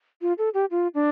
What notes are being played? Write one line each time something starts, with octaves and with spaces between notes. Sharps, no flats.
F4
A4
G4
F4
D4